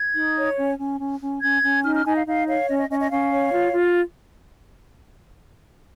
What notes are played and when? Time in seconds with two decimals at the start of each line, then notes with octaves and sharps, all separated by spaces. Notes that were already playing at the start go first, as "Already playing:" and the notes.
Already playing: G#6
0.15 D#4
0.37 C#5
0.58 C#4
0.79 C#4
1.00 C#4
1.21 C#4
1.41 C#4 G#6
1.63 C#4
1.84 D#4 F6
1.94 F6
2.05 D#4 G#5
2.16 F5
2.26 D#4 F5
2.47 C#5 F5
2.68 C#4 D#5
2.78 D#5
2.90 C#4 D#5
3.00 D#5
3.10 C#4 F5
3.31 C#5
3.53 F4
3.73 F4